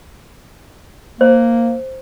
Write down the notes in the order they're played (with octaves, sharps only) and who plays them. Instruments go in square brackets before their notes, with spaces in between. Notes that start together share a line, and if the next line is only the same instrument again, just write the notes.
[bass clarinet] A#3 [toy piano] C5